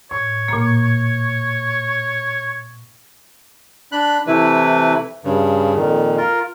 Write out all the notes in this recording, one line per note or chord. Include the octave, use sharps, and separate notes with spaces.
A2 C#5
A#2 A#3
D4 B5 F#6
C3 E3 A3 E4 B4
G2 C#3
F2 A#2 D#3
F4 A#4